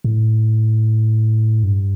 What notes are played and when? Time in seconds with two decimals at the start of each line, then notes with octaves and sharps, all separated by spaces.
0.04 A2
1.63 G2